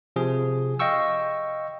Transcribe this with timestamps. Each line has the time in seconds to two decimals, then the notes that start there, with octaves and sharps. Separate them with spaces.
0.16 C3 F3 G#4
0.79 D#5 F5 G5 C#6 E6